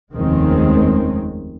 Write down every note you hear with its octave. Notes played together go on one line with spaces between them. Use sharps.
F1 D#2 D#3 G#3 C4 C#4